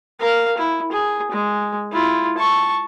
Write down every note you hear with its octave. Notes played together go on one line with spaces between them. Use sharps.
A#4 F5
E4
G#4
G#3
E4 F4
A5 C#6